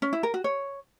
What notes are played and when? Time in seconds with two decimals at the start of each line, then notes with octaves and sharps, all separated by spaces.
0.02 C#4
0.13 E4
0.23 A#4
0.34 F#4
0.44 C#5